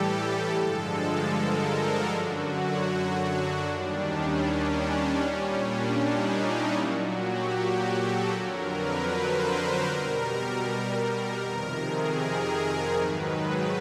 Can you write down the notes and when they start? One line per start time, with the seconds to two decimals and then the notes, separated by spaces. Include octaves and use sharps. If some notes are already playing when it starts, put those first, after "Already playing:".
Already playing: A2 E3 G3 G4 A4
0.55 G2 D3 F3 G#3 A4
0.94 A4
1.33 A#4
2.10 F#2 D3 F#3 F#4
3.27 D4
3.65 D#2 D#3 G3 D4
4.04 C#4
4.43 C#4
4.81 D4
5.20 A#2 G3 C#4
5.59 D4
5.97 D#4
6.36 E4
6.76 A#2 F#3 F#4
7.14 G4
7.53 F#4
7.92 A4
8.30 F2 D3 F#3 A#4
8.69 B4
9.09 C5
9.47 A#4
9.86 B2 G3 A#4
11.03 A#4
11.41 F2 C3 D#3
11.79 G#4
12.18 A#4
12.95 G#2 D#3 F#3 B4
13.34 B4